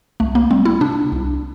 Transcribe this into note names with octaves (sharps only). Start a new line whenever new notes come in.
C2 A3
A#3
G3 C4
E4
C3 D4
C2